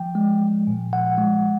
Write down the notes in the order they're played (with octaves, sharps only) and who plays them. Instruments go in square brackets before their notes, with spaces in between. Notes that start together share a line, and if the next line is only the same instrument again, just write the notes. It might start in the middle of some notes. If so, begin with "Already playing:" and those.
Already playing: [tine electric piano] F3 G5
G#3
F3
A#2
F3 F#5
G#3